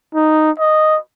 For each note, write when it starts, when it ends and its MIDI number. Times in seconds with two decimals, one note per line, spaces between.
0.14 0.51 63
0.59 0.98 75